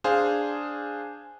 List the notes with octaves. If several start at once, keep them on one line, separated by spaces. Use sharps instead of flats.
D4 G#4 C5 F5